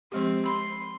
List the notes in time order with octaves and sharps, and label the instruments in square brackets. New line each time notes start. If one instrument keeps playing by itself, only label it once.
[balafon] F3 G#3 G4 [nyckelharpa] C4
[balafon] B5 [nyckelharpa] C6